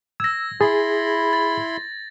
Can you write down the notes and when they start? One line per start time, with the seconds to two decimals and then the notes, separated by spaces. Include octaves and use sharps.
0.20 E6 G#6 A#6
0.61 E4 G#4 B5 C6 A6
1.33 A6